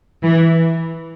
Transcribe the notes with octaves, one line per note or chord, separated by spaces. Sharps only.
E3